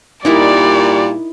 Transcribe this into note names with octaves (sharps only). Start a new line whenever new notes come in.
A#2 G3 D#4 E4 A#4 D5